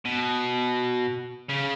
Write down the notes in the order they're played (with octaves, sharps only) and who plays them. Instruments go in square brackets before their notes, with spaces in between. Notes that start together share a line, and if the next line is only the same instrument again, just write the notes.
[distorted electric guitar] B2
C#3